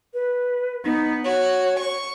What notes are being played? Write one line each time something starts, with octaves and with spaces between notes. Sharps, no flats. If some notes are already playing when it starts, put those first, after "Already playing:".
B4
B3 D#4
F#4 C#5
C#6